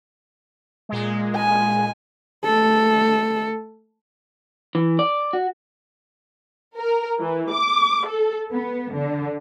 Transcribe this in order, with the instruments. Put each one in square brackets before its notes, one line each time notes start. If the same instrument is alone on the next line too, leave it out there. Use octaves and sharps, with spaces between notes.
[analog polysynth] A#2 G#3
[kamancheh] G#5
[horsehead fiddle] A3 A4
[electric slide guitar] E3
D5
F#4
[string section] A#4
E3
D6
A4
B3
D3